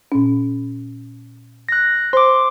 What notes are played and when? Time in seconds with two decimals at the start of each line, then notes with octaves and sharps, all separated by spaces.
0.12 A#2 C#4
1.69 F#6 A#6
2.13 C5 C6 D6